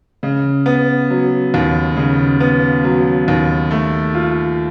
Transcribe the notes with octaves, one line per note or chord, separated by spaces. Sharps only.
C#3
B3
F#3
D#2
C#3
B3
F#3
D#2
A3
F4